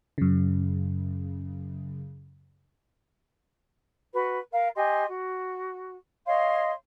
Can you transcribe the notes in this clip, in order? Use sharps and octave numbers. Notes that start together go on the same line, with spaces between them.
F#2 C#3
F#4 B4
A#4 F5
G4 D#5 G#5 C6
F#4
C#5 D#5 F5 C6